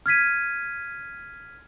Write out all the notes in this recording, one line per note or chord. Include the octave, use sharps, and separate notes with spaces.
F6 G#6 B6 D#7